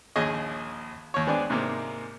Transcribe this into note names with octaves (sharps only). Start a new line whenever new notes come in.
A#1 D#2 G#4 C#5 D#5
D#2 C#5
G#3 B3 C4 D4 D5 G#5
G#2 C3 G#3 A#3